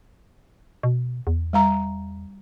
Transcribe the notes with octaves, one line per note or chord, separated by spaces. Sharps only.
B2
E2
G3 F5 A#5